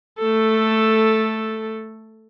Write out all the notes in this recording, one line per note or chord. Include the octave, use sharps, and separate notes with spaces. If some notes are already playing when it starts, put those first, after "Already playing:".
A3 A4